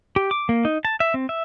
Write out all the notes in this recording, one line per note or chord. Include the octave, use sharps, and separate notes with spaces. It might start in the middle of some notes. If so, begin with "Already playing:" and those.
G4
D6
A#3
D#4
A5
E5
C4
E5